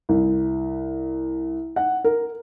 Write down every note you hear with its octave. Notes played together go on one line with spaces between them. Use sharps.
C2
F#5
A#4